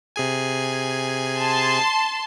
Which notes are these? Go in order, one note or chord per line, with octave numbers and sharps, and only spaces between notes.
C3 G#4 G#5
A5 C6